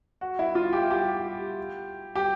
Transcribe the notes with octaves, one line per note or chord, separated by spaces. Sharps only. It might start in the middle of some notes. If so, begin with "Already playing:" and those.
F#4
E4
F4
G4
G4
G4